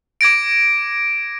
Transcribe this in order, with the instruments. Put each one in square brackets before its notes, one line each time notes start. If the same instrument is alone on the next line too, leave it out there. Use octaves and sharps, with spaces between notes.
[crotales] D6 G#6 A#6 D7